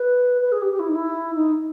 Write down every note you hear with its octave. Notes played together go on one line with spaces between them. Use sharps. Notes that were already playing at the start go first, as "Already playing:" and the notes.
Already playing: B4
B4
G#4
G4
G4
E4
D#4
E4
D#4